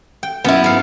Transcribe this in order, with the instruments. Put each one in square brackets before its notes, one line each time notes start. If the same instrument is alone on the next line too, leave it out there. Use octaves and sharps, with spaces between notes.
[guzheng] G5
[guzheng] F#2 [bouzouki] B3 E4
[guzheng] G#2 F5